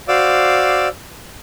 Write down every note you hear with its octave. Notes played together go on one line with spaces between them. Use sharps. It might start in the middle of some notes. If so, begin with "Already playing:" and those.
F#4 C5 D5 F5 D6 E6